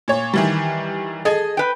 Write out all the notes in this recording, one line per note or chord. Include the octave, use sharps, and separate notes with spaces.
A#2 C#5
D#3 E3 G3
G#4 A4 D#5
B4 G5